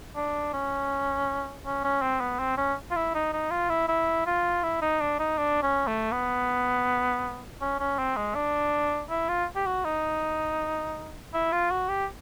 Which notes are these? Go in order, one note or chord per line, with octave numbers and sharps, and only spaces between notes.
D4
C#4
C#4
C#4
C4
B3
C4
C#4
F4
E4
D#4
D#4
F4
E4
E4
F4
E4
D#4
D4
D#4
D4
C#4
A3
B3
C#4
C#4
C4
G#3
D4
E4
F4
G4
F#4
D#4
E4
F4
F#4
G4